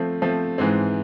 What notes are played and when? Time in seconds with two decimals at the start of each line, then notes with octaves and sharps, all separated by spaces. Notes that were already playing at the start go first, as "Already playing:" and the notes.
Already playing: F3 A3 C4
0.22 F3 A3 C4
0.58 G#2 E3 G#3 C4